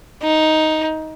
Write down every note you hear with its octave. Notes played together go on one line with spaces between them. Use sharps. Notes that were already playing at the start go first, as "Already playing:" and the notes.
D#4